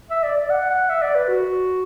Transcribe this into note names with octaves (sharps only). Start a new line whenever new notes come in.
E5
D5
D5
F#5
F#5
E5
D5
B4
F#4